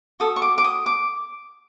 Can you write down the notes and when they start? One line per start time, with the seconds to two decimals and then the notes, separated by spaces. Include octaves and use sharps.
0.20 F#4 A4 D#6
0.36 C#6
0.42 D6
0.58 D6
0.64 D#6
0.86 D6